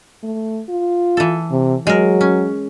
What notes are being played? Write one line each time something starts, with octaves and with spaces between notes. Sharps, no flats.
A3
F4
E3 A4
C3
F#3 G#3 A#4
C#4